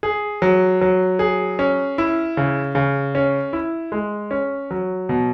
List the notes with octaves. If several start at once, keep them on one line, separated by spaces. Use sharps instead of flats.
G#4
F#3
F#3
G#4
C#4
E4
C#3
C#3
C#4
E4
G#3
C#4
F#3
B2